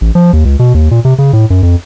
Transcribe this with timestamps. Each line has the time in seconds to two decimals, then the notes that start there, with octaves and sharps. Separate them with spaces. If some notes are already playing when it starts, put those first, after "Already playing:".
0.01 A1
0.15 F3
0.33 D#2
0.45 C#2
0.59 B2
0.74 D#2
0.91 A#2
1.05 C3
1.18 C#3
1.33 A2
1.50 F#2
1.63 F2